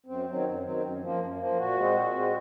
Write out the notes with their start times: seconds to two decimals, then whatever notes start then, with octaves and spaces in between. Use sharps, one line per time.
0.06 F#2 C4
0.25 D#3 F#3 C4
0.45 F#2
0.63 D#3 F#3 C4
0.82 F#2
1.01 F3 A#3
1.20 F#2
1.39 F3 A#3
1.57 A#2 F#4
1.76 G#3 C4
1.95 A#2
2.14 G#3 C4